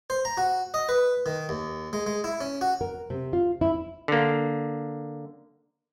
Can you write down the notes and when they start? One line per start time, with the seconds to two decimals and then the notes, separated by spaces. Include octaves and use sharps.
0.10 C5
0.25 A#5
0.37 F#4
0.74 D#5
0.89 B4
1.26 D#3
1.49 D#2
1.93 G#3
2.06 G#3
2.24 E4
2.41 C#4
2.61 F#4
2.81 A#4
3.10 C3
3.33 F4
3.61 E4
4.08 D3 A#3